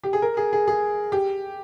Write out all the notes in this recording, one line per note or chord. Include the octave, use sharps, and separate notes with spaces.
G4
G#4
A#4
G#4
G#4
G#4
G4